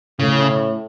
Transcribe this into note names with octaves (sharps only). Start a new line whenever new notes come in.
A2 C#3